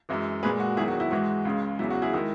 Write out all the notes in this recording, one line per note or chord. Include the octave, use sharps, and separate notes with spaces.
F#2 E3 G#3
A#2 G#3 G#4 B4
F#4
E2 D#3 F#3 E4 G#4
F#4
E4
G#2 E3 G#3 F#4
C#2 C#3 G#3
E2 C#3 F#3 E4
F#4
E4 G#4
D#3 G#3 E4